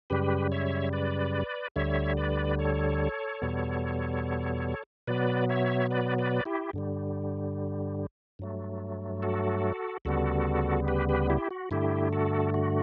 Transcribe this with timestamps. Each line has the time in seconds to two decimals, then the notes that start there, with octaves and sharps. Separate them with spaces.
0.10 F#2 C#3 G3 G4 B4
0.52 C#5 E5
0.93 B4 D5
1.76 D2 D3 G3 C#5 E5
2.17 B4 D5
2.59 A4 C#5
3.42 E2 B2 G3 B3
5.07 B2 F#3 B3 B4 D5
5.49 C#5 E5
5.91 B4 D5
6.18 B4 D5
6.45 E4 G4
6.73 G2 D3 G3
8.39 G2 F#3 A3
9.22 F#4 A4
10.05 D2 C#3 G3 B3 F#4 A4
10.88 G4 B4
11.09 G4 B4
11.30 E4 G4
11.51 F#4
11.71 G2 D3 A3 E4 G4
12.13 F#4 A4
12.54 F#4